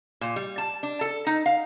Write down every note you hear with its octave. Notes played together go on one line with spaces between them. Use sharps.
A#2
G3
A5
D4
A4
D#4
F5